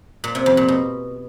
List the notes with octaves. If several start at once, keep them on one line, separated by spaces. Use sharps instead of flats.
A#2
C3
F2
A#2
B2